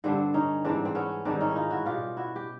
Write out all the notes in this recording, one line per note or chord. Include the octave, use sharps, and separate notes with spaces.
G2 D3 G3 C4 D4
C#4 D#4
G#2 E3 G3 C4 D4
C4
B3 C#4
G#2 D#3 G3 C4 D4
C#4 D#4
E4
D#4 F4
E4 F#4
B2 G3 F4 G4
E4 F#4
G4